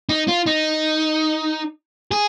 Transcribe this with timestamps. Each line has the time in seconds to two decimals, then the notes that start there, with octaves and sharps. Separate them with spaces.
0.09 D#4
0.28 F4
0.46 D#4
2.12 G#4